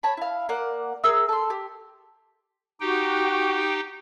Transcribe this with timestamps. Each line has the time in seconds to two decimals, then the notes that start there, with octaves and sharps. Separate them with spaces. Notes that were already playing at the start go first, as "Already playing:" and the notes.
0.03 C#5 A5 B5
0.17 E4 F5
0.49 A#3 D5 F#5
1.04 G#4 A#4 E5 E6
1.29 A4 C6
1.50 G4
2.81 D#4 F#4 G4 G5